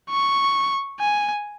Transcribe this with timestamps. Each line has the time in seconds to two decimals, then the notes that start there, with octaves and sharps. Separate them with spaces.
0.10 C#6
1.00 G#5